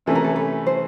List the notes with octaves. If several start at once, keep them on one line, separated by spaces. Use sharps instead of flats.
C3 E3 A3 C#4 A4
A#4
A4
B4
C5